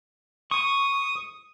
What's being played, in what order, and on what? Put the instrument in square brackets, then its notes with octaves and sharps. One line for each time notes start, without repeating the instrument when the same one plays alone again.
[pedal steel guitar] C#6 [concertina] D#6